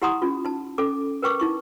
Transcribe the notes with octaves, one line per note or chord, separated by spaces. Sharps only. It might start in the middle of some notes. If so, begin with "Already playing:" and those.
E4 G4 F#5 A#5 C6 D#6
C#4 F4
D#4 A5
C#4 A4 D6
A#4 B4 G5 C#6 D6
D#4 E4 C#6